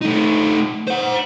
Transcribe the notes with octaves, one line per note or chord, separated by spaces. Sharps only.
A3 D#4
C5 F#5